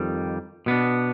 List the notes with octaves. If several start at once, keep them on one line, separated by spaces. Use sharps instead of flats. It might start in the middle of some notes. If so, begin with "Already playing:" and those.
Already playing: F2 D#3 G3
B2 B3 D4